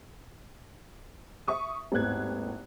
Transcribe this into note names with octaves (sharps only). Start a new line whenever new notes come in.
E5 C#6 D#6
G#1 D#2 A2 B3 F#6 G#6